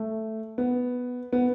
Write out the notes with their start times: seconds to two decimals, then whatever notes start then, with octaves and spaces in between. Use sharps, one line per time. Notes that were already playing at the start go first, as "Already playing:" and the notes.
Already playing: A3
0.58 B3
1.33 B3